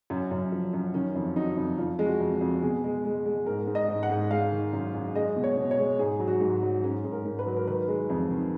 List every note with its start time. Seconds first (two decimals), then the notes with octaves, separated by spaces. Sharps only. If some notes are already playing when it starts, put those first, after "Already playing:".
0.10 F#2 C#4
0.31 F#2
0.52 F3
0.73 F#2
0.94 D#3 C#4
1.15 F2
1.36 F#3 D#4
1.57 F2
1.78 F2 F4
1.99 G#3
2.06 F#4
2.20 F2
2.35 F#4
2.41 F2
2.63 B2 G#4
2.84 G#3
3.05 G#3
3.26 G#3
3.46 G#2 A#4
3.67 G#2
3.75 D#5
3.88 G#2
4.03 F#5
4.10 G#2
4.31 G#3 F5
4.52 D#3
4.73 F#2
4.94 F#2
5.15 G#3 D#5
5.36 B2
5.44 C#5
5.57 B2
5.71 C#5
5.79 G#3
5.99 G#2 G#4
6.20 F#3
6.28 F#4
6.41 G#2
6.63 F#3
6.83 G#2 C#4
7.05 G#2
7.12 A#4
7.25 G#2
7.39 B4
7.46 F#3
7.57 A#4
7.68 D#3 B4
7.88 G#3
8.10 F2
8.31 D#3